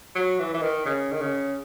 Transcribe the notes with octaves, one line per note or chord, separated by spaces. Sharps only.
F#3
E3
E3
D#3
C#3
D#3
C#3